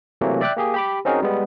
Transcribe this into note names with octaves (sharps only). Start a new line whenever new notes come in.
C3 E3 F#3 A3 A#3
D5 E5 G5 D6 F#6
A#3 G4 G#4
G4 B5 D6
C4 C#4 D#4 F#4 G#4 A#4
G3 G#3 B3